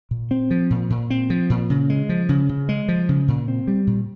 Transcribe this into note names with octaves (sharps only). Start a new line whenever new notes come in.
A#2
C4
F3
A#2
A#2
C4
F3
A#2
C#3
G#3
F3
C#3
C#3
G#3
F3
C#3
A#2
C4
G3
A#2